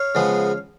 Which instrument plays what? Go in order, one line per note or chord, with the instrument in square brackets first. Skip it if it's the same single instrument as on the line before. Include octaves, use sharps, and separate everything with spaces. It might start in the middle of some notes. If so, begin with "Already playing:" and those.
Already playing: [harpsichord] C#5 F5
C#3 F3 G#3 B3